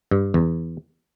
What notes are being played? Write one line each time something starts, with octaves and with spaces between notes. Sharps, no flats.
G2
E2